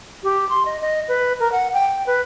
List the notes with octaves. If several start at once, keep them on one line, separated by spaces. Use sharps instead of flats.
G4
C6
D#5
D#5
B4
A#4
F#5
G5
B4